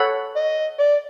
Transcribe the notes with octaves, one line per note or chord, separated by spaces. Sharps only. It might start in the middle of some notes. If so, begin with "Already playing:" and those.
Already playing: A4 C#5 F#5 B5
D#5
D5